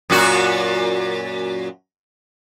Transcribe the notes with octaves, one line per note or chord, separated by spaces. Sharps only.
F#2 A#2 F#4